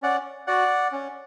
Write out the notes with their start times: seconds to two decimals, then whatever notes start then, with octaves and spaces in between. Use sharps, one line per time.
0.02 C#4 D5 F#5
0.47 F#4 D5 F#5
0.92 C#4